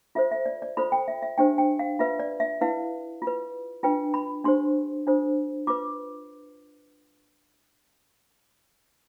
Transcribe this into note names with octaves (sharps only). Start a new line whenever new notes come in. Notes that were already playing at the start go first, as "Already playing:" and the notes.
F4 A4 C5 E5
E5
D5
D5
F4 A4 C5 B5
G5
E5
E5
D4 G4 C5 G5
G5
F5
F4 B4 E5
D5
E5
E4 B4 F5
F4
B4
D4 F4 B4 G5
B5
D4 G4 C5 C6
D4 F4 A4 C5
F4 B4 D6